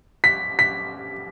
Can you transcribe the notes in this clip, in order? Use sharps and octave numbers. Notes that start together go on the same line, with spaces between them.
B6
B6